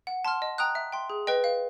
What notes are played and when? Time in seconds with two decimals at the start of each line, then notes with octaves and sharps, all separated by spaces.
0.07 F#5
0.25 A5 C6 F6
0.42 D#5
0.58 G5 A#5 D#6 F#6
0.75 E5
0.92 G5 C6
1.10 G#4
1.27 B4 D#5 G5
1.44 F5